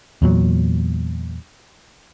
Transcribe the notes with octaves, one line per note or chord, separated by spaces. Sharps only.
E2 A#2 F#3